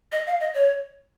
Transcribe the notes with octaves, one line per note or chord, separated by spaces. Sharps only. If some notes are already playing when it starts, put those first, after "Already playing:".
D#5
F5
D#5
C#5